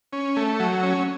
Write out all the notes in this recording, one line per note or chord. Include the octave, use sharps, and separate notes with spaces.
C#4
A3
F#3
C#4